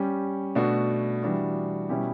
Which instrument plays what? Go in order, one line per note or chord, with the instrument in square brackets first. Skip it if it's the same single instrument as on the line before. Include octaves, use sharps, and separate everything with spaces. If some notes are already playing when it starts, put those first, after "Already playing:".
Already playing: [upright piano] G3 C#4 G4
B2 A3 D4 F#4
E3 G3 D4 F#4
B2 G3 C#4 E4 G4